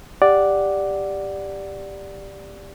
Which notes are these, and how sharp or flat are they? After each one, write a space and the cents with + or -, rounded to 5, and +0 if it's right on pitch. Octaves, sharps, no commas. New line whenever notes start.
G4 +10 D5 +0 F#5 +0